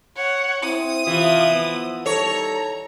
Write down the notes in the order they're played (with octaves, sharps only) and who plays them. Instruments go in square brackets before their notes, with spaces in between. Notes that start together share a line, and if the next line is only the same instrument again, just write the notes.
[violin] C#5 F#5
[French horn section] C4 E4 [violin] D#6
[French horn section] C3 F4 [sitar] E3
[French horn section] F3 B3
[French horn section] D#3 G3 A4 [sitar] C#5 [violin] A#5